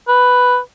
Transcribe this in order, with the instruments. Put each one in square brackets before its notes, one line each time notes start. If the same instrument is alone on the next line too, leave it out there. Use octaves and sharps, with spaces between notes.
[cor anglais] B4